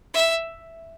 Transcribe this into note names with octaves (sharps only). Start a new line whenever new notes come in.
E5